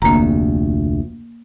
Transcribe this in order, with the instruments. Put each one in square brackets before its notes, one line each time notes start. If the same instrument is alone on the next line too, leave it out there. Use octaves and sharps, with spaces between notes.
[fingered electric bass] F1 D2 [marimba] A#3 A#5